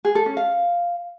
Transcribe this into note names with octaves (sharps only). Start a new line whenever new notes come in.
G#4
A4
C#4
F5